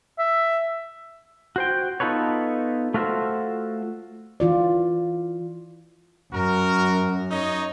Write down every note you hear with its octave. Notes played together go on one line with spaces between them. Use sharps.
E5
F#4 C5 G5
B3 D#4 F4 A4 B4 C#5
A3 F4 F#4 A#4 C5 E5
E3 F4 D5
F#2 F#4 A#4
D#4 C#5 D#5